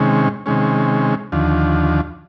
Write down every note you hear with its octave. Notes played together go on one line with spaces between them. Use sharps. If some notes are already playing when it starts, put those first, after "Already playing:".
Already playing: C3 D#3 G#3 C#4
C3 D#3 G#3 C#4
D#2 D3 F3